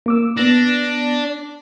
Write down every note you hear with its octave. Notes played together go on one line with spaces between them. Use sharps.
A#3 D6 E6
B3 D4 A#6